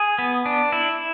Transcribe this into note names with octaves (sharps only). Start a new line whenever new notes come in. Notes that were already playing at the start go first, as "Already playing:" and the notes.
Already playing: G#4
B3
D4
E4